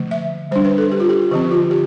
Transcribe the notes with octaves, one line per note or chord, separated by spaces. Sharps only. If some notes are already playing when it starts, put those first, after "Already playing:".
Already playing: D3 F3 A3
E5
G3 D4 C5
B4
A4
G4
F4
G4
D3 F3 C4 G4
F4
G4